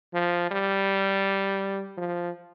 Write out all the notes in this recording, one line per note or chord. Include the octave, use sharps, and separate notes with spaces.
F3
G3
F3